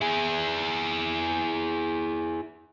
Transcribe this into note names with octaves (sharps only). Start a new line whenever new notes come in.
E4 G#4